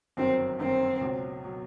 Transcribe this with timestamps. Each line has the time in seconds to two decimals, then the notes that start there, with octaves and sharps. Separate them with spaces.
0.17 G1 F#2 D#3 F#3 C4
0.59 G1 F#2 D#3 F#3 C4
1.01 C#2 B2 F#3
1.45 B2 F#3